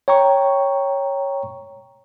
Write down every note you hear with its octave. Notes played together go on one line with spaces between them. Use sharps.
C#5 G5 A#5 C#6